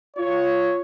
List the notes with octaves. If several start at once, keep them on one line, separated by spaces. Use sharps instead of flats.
F4 C#5